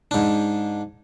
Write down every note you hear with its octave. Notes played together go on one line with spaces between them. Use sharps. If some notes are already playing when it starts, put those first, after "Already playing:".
G#2 D4